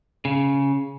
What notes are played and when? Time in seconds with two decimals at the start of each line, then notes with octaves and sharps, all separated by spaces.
0.25 C#3